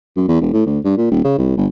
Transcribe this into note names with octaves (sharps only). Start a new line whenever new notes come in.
F#2
E2
E1
A2
D2
G2
A#2
D#1
C#3
C2
G1